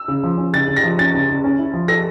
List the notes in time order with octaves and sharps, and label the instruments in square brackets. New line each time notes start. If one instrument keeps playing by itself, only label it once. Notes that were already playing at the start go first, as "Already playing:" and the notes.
Already playing: [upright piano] E6
[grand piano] C#3
F3
C#4
[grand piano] C#3 [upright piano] A6
[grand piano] C#3
[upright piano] A#6
[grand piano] F3
[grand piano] C#4 [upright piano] A6
[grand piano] C#3
C#3
C#4
E4
F3
[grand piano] A4 [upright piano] A#6